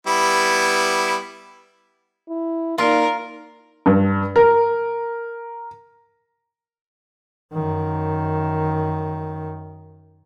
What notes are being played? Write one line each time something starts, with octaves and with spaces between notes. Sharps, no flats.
G3 B3 E4
E4
A#3 D#4 F4 A#4 D5 A#5
G2
A#4
F#2 D#3